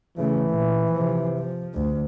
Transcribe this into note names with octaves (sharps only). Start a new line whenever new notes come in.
C#3 E3 A3
A#2
C3 F3
F3
D2